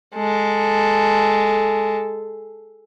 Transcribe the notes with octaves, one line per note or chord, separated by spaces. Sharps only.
G#3 A4